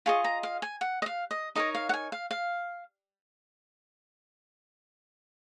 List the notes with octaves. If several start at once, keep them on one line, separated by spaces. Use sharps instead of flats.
F4 G#4 D#5 C#6
A#5
F5
G#5
F#5
D#5
F5
D#5
D#4 A#4 C#5 D#5
F5
F#5
G#5
F5
F5